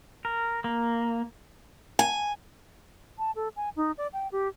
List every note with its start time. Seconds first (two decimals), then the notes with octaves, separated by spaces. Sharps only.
0.25 A#4
0.64 A#3
1.99 G#5
3.18 A5
3.36 A4
3.56 G#5
3.76 D#4
3.98 D5
4.13 G5
4.32 G4